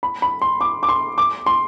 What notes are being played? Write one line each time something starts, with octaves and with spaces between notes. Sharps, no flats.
B5
B5
C6
D6
D6
C6
D6
C6